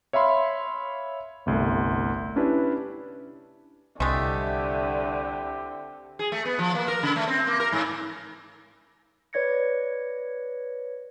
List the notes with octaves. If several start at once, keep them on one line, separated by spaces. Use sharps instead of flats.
C#5 E5 F5 B5 C6
G1 C2 A3
C#4 D4 E4 G4 B4
C2 D3 G#3 A3 C4 E4 G4
G#4
A3
B3
F3
A#3
A#4
C#3
A3
C4
A#3
A#4
G#2
B4 C#5 D5 G#6 A#6 C#7